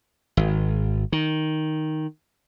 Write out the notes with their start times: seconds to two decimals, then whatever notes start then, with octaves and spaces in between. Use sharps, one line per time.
0.37 G#1
1.12 D#3